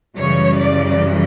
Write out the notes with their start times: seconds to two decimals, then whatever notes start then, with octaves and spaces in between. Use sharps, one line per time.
0.15 F#2 C#3 E3 G3 C#5
0.57 D5